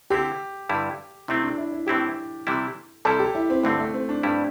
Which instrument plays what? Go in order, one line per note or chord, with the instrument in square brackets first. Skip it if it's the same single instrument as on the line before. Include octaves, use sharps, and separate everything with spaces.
[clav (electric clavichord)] D3 C4 E4 [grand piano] G4
[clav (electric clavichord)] G2 D3 G3 E4
[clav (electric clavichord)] C3 A3 C4 [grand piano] E4
[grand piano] D4
E4
E4
[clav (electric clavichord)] A2 E3 C4 E4 [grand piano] G4
[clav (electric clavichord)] C3 E3 G3 E4
[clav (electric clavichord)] C3 G3 E4 [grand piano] A4
[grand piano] G4
E4
C4
[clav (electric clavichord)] G2 D3 C4 [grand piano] A3
[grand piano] A3
C4
D4
[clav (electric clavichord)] G2 G3 E4 [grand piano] D4